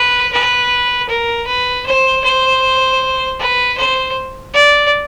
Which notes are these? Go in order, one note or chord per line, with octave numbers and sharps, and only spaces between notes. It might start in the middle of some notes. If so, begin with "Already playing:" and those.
Already playing: B4
B4
A#4
B4
C5
C5
B4
C5
D5